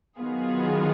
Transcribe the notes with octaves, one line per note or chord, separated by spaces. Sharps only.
D#3 F#3 B3 F4 G#4